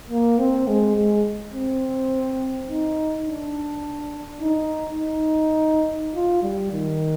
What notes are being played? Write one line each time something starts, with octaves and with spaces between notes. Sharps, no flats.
A#3
C4
G#3
G#3
C4
D#4
D4
D#4
D#4
F4
G3
D#3